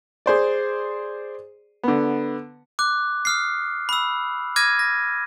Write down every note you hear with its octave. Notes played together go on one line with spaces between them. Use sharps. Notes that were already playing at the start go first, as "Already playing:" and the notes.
G#4 C5 D5
D3 B3
D6 F#6
D#6 F6 C7
B5 E6
D6 F6 G#6 A#6 D#7
A#6